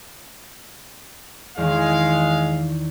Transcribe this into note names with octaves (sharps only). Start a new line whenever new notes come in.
E2 D#3 G#3 F5